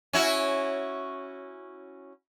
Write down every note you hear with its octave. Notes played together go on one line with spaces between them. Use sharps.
C#4 E4 F#4